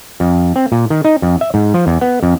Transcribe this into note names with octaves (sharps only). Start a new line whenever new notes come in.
F2
C4
A#2
D#3
D#4
F2
E5
G#2
F3
E2
B3
F2